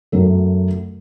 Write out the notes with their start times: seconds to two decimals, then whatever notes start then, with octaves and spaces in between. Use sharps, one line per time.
0.12 F#2 F#3 A3